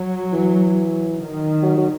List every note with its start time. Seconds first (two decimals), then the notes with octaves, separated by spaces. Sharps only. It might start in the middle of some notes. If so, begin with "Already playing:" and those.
Already playing: F#3
0.33 E3
1.20 D#3
1.62 F#3
1.77 F#3